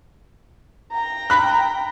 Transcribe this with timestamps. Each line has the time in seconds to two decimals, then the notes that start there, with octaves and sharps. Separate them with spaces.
0.92 G5 A#5
1.30 B5 F#6